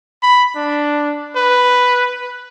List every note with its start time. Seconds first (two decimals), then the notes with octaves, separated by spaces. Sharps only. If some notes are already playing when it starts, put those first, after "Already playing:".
0.23 B5
0.56 D4
1.36 B4